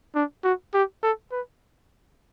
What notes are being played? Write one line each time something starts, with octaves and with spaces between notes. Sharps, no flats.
D4
F#4
G4
A4
B4